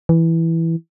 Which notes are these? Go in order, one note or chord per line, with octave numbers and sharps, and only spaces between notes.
E3